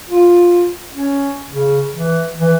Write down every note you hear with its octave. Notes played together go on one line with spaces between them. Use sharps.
F4
C#4
C#3
E3
E3